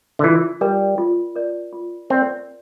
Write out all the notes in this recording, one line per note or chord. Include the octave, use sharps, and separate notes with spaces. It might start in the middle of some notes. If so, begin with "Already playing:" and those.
D3
E3 F4
G3 A#4 D5
F4
A#4 D5
F4
C4 A#4 D5